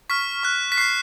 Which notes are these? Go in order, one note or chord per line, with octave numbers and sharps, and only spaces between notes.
C#6 F6 B6
C#6 F#6
B6
C#6 F#6 C7